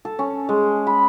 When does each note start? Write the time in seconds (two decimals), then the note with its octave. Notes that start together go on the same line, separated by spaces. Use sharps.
0.05 A4
0.19 C#4
0.49 G#3
0.87 B5